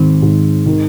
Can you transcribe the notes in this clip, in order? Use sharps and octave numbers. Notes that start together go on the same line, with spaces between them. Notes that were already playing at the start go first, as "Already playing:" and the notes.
Already playing: G#2 D#3 C4
G#2
D#3